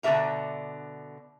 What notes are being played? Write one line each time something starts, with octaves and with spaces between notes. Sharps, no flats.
B2 D3 D4 A4 E5 A#5